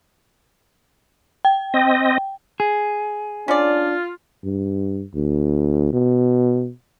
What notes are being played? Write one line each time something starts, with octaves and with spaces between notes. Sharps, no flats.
G5
C4 D#5
G#4
C#4 D4 F4 D5
G2
D2
B2